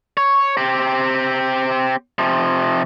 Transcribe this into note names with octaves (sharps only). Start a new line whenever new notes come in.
C#5
C4 G4
C3 F3